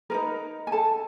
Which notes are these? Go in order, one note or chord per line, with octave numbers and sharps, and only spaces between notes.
D#4 G#4 A#4 B4 A#5
G#5
A4 A5